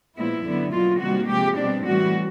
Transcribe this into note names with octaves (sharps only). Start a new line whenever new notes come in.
A#2 F3 G#3 B3 E4
F#2 D3 F#3 B3
B2 F#3 A#3 F4
C3 D#3 G3 A#3 F#4
C3 F3 G#3 G4
B2 G3 C4 D4
A2 E3 G3 F#4